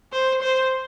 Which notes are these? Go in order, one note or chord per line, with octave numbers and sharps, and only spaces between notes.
C5
C5